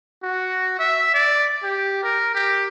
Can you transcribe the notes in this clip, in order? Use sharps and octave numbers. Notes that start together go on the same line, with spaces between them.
F#4
E5
D5
G4
A#4
G4